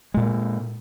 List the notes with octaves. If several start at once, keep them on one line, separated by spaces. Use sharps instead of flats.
A#2 G#3